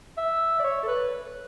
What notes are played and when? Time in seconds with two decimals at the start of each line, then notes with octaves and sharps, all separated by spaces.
0.17 E5
0.60 D5
0.64 C#5
0.83 A4
0.88 B4